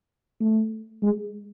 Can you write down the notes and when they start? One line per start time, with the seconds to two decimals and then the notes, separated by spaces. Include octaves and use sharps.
0.40 A3
1.03 G#3